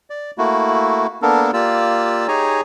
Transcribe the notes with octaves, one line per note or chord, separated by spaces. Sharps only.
D5
A3 A#3 E4 F#4
A#3 B3 D4 A4 A#4
A#3 F4 G4 D5 E6
D#4 G4 G#4 C#5 G#5 A#5